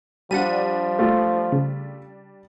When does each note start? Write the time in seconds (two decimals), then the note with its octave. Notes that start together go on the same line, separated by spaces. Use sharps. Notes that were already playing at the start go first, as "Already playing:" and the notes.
0.31 F3 G3 D4 F#5 D#7
0.99 A3 F4
1.52 C#3